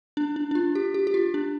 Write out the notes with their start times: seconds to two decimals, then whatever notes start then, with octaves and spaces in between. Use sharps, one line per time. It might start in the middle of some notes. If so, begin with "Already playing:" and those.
0.17 D4
0.36 D4
0.51 D4
0.55 F4
0.75 G4
0.94 G4
1.07 G4
1.14 F4
1.34 D4